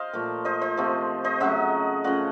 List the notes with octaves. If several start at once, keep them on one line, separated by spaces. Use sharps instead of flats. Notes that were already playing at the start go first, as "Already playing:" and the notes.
Already playing: C5 D#5 F5
A#2 F3 A3
C5 D#5
C5 D#5
C3 F3 A3
C5 D#5
C#3 F#3 A3 D#5 F#5
C#3 F3 A3 D#5 F#5